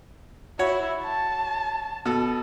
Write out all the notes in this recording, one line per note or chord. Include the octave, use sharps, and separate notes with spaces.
E4 F#4 C#5
A5
B2 A4